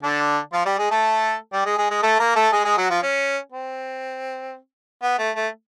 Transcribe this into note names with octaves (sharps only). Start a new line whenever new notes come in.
D3 D4
F3 F4
G3 G4
G#3 G#4
A3 A4
G3 G4
G#3 G#4
G#3 G#4
G#3 G#4
A3 A4
A#3 A#4
A3 A4
G#3 G#4
G#3 G#4
F#3 F#4
F3 F4
C#4
C4
B3
A3
A3